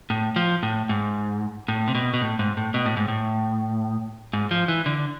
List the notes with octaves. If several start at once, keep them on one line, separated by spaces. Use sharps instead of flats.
A2
F3
A2
G#2
A2
C3
B2
B2
A2
G#2
A2
B2
A2
G#2
A2
G#2
F3
E3
D3